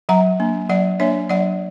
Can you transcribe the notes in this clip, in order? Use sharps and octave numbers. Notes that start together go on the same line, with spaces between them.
F#3 F#5 A#5
A#3 D4
F#3 D5 F#5
A#3 D4 C#5 E5
F#3 D5 F#5